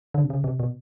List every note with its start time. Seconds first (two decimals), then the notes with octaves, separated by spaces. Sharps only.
0.14 D3
0.24 C3
0.30 C#3
0.44 C3
0.59 B2